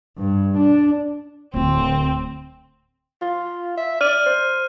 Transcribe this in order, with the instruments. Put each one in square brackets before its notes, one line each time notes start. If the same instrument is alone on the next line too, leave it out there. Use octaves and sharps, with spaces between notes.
[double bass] G2
D4
[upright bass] D1 D3 [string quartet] C4
[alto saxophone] F4
E5
[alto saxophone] D5 [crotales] F6 D#7
[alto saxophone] C5